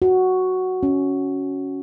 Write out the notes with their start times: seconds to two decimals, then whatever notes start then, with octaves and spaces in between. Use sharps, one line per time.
0.02 F#4
0.83 C#4